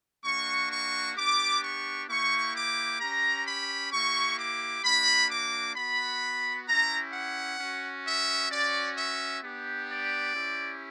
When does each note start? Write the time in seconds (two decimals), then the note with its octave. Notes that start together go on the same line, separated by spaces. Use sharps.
0.24 A#3 D4 F#4 C#6
0.71 C#6
1.16 B3 D4 G4 D6
1.62 C#6
2.08 A#3 E4 G4 C#6
2.54 D6
3.00 C#4 G4 A#5
3.46 B5
3.91 A#3 E4 G4 C#6
4.38 D6
4.83 A#3 D4 F#4 B5
5.29 D6
5.75 B3 F#4 B5
6.67 C#4 E4 G4 A#5
7.12 F#5
7.58 C#4 F#4
8.05 E5
8.50 C#4 F#4 D5
8.97 E5
9.42 B3 D4 G4
9.89 D5
10.34 C#4 E4 G4